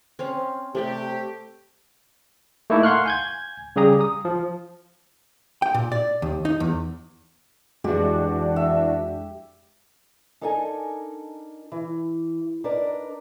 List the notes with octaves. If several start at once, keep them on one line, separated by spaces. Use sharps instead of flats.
C4 C#4 F5
C3 A3 G4 D5 G5
A3 A#3 D#4 E4 A4
F5 F#5 C6 C#6 F6 F#6
G#5 G6 G#6
C#3 G3 G4 G#4 A#5 D#6
D#6
F3
G5
A#2
D5
D#2
D#4
E2
F2 E3 G#3 D4 F#4 G4
E5
D4 D#4 A4 A#4 G5 G#5
E3
D4 D#4 A#4 B4 D5